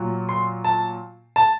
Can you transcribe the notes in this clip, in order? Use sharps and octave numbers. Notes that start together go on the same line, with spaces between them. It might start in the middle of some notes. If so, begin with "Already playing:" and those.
Already playing: A#2 F#3
C6
A5
A5